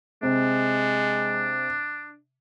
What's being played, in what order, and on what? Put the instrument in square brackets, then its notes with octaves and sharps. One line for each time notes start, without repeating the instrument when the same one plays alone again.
[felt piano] C3 [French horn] G#3 [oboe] D4